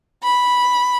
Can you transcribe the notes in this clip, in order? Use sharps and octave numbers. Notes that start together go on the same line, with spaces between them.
B5